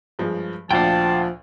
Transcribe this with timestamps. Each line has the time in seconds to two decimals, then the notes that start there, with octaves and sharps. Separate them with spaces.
0.19 G2 F3 G#3
0.71 D2 A#2 F3 D4 F5 G5 A5